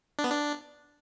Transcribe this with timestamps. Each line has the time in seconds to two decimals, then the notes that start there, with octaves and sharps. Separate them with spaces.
0.19 D4
0.24 B3
0.30 D4